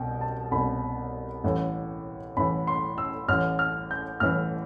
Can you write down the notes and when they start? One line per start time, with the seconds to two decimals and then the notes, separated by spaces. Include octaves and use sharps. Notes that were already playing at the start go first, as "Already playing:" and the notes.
Already playing: C2 B2 G5
0.21 A5
0.51 C2 B2 B5
1.44 A1 A2 E3
2.37 A1 A2 E3 B5
2.67 C6
2.98 E6
3.28 A1 A2 E3 F6
3.59 F6
3.91 G6
4.20 A1 A2 E3 F6